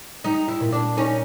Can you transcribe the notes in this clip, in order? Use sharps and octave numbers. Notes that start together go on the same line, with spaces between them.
G3 D#4
E4
A#2
D4
C#4 D#4